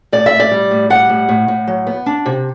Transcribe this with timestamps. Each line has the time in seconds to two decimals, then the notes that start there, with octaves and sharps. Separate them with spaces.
0.12 A2 D5
0.26 E5
0.32 A2
0.40 D5
0.51 G3
0.71 A2
0.90 G3 F#5
1.09 A2
1.29 A2
1.48 A2
1.68 F#3
1.87 B3
2.06 D4
2.26 C3